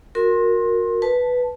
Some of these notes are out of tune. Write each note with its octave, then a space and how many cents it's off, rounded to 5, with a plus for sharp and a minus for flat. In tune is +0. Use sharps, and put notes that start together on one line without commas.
F#4 -25 A#4 -10 C6 +25
B4 +0 A5 +0